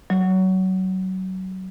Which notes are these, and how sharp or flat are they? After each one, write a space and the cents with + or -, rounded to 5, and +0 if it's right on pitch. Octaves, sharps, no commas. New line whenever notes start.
F#3 +20